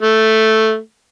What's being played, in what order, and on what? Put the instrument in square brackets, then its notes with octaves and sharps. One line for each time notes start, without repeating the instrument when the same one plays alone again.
[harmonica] A3